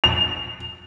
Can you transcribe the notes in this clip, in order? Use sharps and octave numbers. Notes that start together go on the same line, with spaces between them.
F7